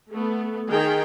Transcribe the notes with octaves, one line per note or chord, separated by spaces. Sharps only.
A3 B3
D#3 G#4 G5